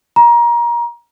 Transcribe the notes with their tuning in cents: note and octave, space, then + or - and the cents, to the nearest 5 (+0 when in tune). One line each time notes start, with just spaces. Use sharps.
A#5 +25